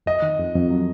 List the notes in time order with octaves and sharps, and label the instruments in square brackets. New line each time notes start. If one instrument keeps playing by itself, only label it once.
[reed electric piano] F2 [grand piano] D#5
[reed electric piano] D#3
F2
F2
F#3